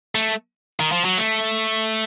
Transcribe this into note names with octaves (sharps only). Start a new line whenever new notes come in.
A3
D#3
F3
F#3
A3